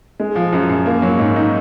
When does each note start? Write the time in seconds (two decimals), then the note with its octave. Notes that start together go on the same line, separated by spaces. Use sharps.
0.20 G#3
0.36 F3
0.53 F#2
0.69 F#2
0.86 A#3
1.02 F#3
1.19 G#2
1.36 D#4